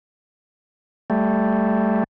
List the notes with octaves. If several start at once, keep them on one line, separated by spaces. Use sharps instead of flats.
G3 A3